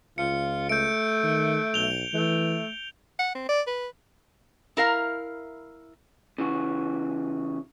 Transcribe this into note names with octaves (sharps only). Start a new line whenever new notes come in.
C#2 F4 C#7
A3 G6 D7
D#3
B1 F7 G7
E3 A3
F#5
C4
D5
B4
E4 A#4 F5
C#3 E3 F#4